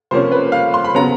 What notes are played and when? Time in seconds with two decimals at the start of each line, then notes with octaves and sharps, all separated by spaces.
0.11 C3 F3 A#3 C#4 C5
0.32 B4
0.52 F5
0.74 C6
0.84 B5
0.94 C#3 F#3 B3 A#5